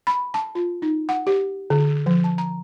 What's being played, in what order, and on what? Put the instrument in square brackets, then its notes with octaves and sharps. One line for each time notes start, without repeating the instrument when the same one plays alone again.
[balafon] B5
A5
F4
D#4
F#5
G4
D3
F3
A5
A#5